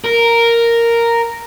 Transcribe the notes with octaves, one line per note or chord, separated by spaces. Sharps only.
A#4